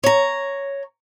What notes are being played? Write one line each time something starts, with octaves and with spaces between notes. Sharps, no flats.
C#5 A#5